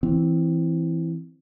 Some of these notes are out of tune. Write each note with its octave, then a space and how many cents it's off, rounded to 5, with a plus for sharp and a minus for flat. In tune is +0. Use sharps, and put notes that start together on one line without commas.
E3 +0 C4 +0